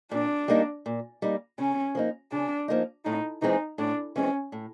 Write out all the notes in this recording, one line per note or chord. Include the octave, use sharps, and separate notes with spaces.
A#2 D4
G3 A#3 D#4
A#2
G3 A#3 D#4
C#3 C#4
F3 A#3 D#4
C#3 D4
F3 A#3 D#4
A2 D#4
E3 G#3 C4 D#4
A2 D4
E3 G#3 C4 C#4
A2